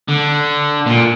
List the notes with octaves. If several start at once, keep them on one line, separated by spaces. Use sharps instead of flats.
D3
A#2